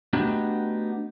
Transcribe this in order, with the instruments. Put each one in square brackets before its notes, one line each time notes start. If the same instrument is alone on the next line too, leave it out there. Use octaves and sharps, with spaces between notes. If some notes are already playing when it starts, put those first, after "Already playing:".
[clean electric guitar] A3 B3 D4 D#4 F#4 G4